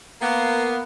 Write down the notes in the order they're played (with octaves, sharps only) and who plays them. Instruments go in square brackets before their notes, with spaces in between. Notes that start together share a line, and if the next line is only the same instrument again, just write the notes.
[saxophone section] A#3 B3